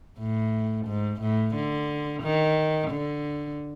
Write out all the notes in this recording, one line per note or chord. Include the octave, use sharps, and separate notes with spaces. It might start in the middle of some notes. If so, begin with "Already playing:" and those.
A2
G#2
A2
D3
D#3
D3